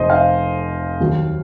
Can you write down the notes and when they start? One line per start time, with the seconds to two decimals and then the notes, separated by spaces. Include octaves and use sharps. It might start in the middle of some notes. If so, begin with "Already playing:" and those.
Already playing: F1 F2 C5 D#5
0.10 F5
1.00 D#2 D#3 F#3